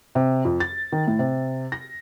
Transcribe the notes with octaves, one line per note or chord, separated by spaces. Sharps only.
C3
F2
A6
D#3
A2
C3
A#6